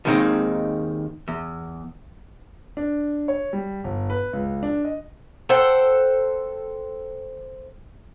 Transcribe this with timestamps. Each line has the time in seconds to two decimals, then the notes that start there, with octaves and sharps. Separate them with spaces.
0.05 D#2 D#3 G#3 A3 C4 D#4
1.28 E2
2.77 D4
3.28 C#5
3.53 G3
3.84 G1
4.10 B4
4.33 C#2
4.63 D4
4.85 D#5
5.49 A4 C5 F#5 G5